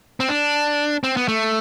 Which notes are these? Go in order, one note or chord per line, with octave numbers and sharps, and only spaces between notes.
C4
D4
C4
B3
A3